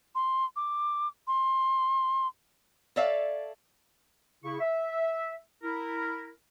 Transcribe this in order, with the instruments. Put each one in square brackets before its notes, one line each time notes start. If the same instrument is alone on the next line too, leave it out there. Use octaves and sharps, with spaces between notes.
[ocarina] C6
D6
C6
[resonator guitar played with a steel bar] A4 C#5 D5 E5 F5
[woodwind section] C#3 E4 C#6
E5
E4 A#4